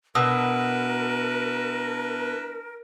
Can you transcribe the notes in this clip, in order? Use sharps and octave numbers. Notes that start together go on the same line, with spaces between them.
B2 D4 E4 A#4 B4 D#6 E6